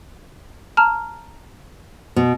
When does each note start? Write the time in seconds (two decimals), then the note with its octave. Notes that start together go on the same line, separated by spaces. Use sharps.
0.77 A5 A#5 F6
2.16 B2